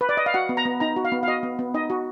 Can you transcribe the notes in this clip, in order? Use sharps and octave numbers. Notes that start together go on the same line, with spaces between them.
B4
D5
D#5
F5
F#4 F#5
B3
A#5
B3
D#4 A#5
F#4
F5
B3
F5
F#4 D#5
B3
B3
D#4 D#5
F#4